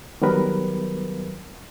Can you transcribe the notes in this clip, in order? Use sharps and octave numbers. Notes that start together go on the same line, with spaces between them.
D#3 F#3 G3 B3 A#4 B4